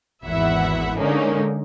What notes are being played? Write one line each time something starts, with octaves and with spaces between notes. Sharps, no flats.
G#1 E2 E4 E5 F#5
D3 G#3 A#3 C#4 D#4